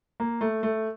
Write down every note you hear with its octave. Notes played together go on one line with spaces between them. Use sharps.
A#3
A3
A3